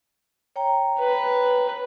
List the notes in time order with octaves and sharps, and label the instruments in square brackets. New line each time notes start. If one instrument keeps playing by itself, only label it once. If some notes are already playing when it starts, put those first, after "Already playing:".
[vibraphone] C#5 G5 A#5
[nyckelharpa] B4